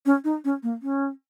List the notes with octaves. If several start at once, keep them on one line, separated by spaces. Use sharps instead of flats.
C#4
D#4
C#4
A#3
C#4